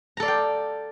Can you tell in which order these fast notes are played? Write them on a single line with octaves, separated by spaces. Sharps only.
A#5 A4 D5 F5 G5